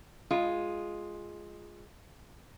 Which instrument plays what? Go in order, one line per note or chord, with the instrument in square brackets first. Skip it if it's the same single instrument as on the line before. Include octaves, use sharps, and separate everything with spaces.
[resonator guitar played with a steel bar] G#3 F4